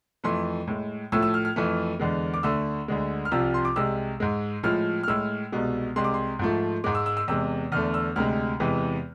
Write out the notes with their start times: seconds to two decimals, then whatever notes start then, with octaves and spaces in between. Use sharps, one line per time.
0.24 F2 E3 A3 C6
0.67 A2 G#3
1.12 A2 F3 A3 E6
1.23 E6
1.34 F6
1.45 F6
1.56 F2 E3 A3
2.00 E2 D3 G#3
2.34 D6
2.43 D2 D3 A3 E6
2.88 D2 D3 G#3
3.25 F6
3.31 C2 C3 F3 E6
3.54 C6
3.65 D6
3.76 C2 C3 G#3 E6
4.20 G#2 G#3
4.63 A2 F3 G#3 F6
5.03 F6
5.08 A2 G#3 E6
5.52 C2 B2 G#3
5.96 C2 C3 G#3 C6
6.04 D6
6.14 C6
6.39 G#2 F3 A3
6.84 G#2 G#3 D6
6.95 E6
7.06 E6
7.17 E6
7.28 E2 C3 G#3 E6
7.72 E2 D3 A3 F6
7.94 E6
8.16 D2 C3 G#3 F6
8.60 E2 C3 E3 G#3